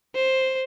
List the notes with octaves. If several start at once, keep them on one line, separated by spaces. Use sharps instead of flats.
C5